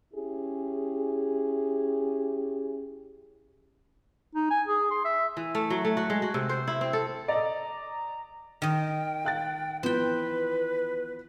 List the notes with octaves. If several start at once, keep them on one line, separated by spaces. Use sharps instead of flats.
C#4 E4 G4 G#4
D#4
G#5
G#4
C6
E5
E3
A3
F#3
A3
F#4
G#3
F#4
C3
C5
E4
C4
A4
D5 D#5 A#5
D#3 D#5 G5
F5 F#6 A6
E3 F3 B3 B4 C5 G5